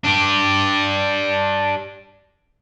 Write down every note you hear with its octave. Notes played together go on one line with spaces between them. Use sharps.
D4 G4